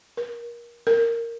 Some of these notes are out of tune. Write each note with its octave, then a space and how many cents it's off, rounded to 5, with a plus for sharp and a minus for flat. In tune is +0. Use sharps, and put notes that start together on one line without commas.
A#4 +25
A#4 -10